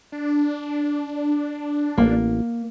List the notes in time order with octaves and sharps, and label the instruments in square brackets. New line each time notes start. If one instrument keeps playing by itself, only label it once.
[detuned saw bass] D4
[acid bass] A1 [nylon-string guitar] A#3